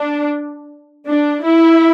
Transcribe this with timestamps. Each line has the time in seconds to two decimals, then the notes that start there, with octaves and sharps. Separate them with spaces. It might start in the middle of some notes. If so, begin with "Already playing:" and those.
Already playing: D4
1.05 D4
1.42 E4